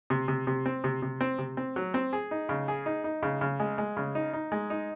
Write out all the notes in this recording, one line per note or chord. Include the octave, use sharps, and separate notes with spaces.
C3
C3
C3
C4
C3
C3
C4
C3
C4
F#3
C4
G#4
D#4
C#3
G#4
D#4
D#4
C#3
C#3
G#3
G#3
C#3
D#4
D#4
G#3
D#4